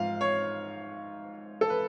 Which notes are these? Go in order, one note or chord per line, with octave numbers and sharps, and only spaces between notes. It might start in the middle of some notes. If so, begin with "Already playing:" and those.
Already playing: G#2 F3 F5
C#5
A4
B4